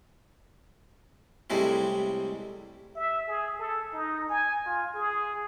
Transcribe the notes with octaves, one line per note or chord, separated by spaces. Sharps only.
A2 C3 G3 G#3 C4 E4
E5
G#4
A4
D#4
G#5
F4
G#4